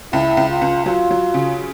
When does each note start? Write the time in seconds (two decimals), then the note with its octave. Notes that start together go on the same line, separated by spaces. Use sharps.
0.13 C#2 E4
0.37 C#2
0.50 F4
0.61 C#2
0.86 F#3 F4
1.11 F#3
1.34 C#3